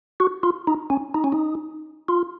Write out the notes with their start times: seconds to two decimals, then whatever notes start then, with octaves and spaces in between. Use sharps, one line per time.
0.20 F#4
0.43 F4
0.67 D#4
0.90 C#4
1.14 D#4
1.24 C#4
1.32 D#4
2.08 F4